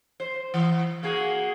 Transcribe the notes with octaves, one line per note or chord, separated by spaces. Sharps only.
C5
E3
A#3 F#4 G#4